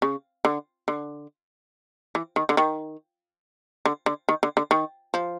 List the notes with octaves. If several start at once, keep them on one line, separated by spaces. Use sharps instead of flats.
C#3
D3
D3
E3
D#3
D3
D#3
D3
D3
D#3
D3
D3
D#3
F3